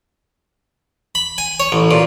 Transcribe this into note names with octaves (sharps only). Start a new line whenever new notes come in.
B5
G#5
C#5
A1
A#2